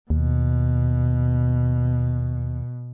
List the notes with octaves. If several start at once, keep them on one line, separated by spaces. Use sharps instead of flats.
D#2 B2